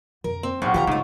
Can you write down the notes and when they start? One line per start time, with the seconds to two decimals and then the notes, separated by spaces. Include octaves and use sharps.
0.24 F2 D3 A#4
0.43 C4
0.62 B1 A2 C4 F#4 G4 F5
0.74 D#3 F3 G3 G4 C5 F#5 A#5
0.87 G#2 C#3 A3 D#4 F4 C#5 D6